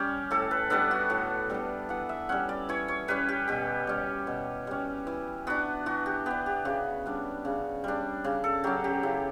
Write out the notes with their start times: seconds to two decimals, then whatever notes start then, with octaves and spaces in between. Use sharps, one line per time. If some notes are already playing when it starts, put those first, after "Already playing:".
Already playing: G3 C#4 G4
0.31 A2 A4
0.51 B4
0.70 G3 B3 D4 A4
0.91 F#4
1.10 A2 F#4
1.50 G3 B3 D4 A4
1.89 E3 F#5
2.09 E5
2.29 G3 C#4 F#5
2.49 D5
2.69 E3 C#5
2.88 C#5
3.08 G3 C#4 B4
3.29 G4
3.48 B2 G4
3.87 G3 C#4
4.27 B2
4.67 G3 C#4
5.07 E3
5.47 B3 D4 F#4
5.86 E3 F#4
6.06 G4
6.26 B3 D4 G4
6.46 G4
6.65 C#3 F#4
7.06 G3 D4
7.45 C#3
7.84 G3 D4
8.24 C#3
8.44 A4
8.64 F#3 C#4 G4
8.84 G4
9.03 C#3 E4